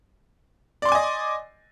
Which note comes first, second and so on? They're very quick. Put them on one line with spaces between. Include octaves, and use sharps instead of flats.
D5 C6 D6 G#5 D#5